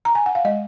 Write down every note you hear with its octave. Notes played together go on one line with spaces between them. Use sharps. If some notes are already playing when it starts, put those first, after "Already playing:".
A#5
G#5
F#5
F5
G#3 D#5